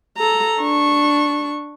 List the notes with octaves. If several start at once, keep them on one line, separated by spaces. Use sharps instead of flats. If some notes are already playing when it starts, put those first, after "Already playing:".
A4 A#5
D4 C#6